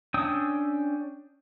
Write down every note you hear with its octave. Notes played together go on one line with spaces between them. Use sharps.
C#4 D4 G5 D#6 E6